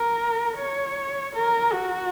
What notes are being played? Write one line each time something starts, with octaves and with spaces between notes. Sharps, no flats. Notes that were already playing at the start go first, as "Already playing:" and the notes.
Already playing: A#4
C#5
A#4
F#4